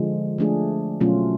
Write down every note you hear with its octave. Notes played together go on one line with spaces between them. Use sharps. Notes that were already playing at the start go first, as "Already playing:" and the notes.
Already playing: D3 F3 G#3
F3 A3 D4 G#4
B2 F#3 A3 C#4 F4